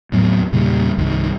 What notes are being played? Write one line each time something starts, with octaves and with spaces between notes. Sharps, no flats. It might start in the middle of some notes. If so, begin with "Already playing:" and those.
D#2 A2 F#3 B3
E2 A#2 C#3 G3
C2 G2 D#3